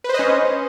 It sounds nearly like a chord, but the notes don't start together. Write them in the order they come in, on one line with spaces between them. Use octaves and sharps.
B4 C5 D#5 C#4